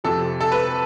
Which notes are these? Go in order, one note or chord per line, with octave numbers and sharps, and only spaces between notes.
F2 C3 F3 A4
A4
B4